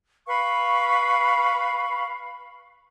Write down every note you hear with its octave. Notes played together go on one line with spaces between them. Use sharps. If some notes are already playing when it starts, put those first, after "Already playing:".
B4 F5 B5 C#6